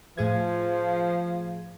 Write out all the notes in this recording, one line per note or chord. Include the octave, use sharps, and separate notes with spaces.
A2 F3 G#4 G#6